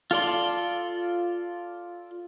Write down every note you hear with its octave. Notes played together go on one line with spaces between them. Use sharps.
F4 A4 D5 C6